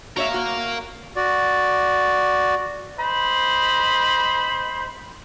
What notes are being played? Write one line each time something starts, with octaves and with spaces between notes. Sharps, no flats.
F#4 A#4 C#5 E5 F5
F#4
F#4 D5
C5 D#5 B5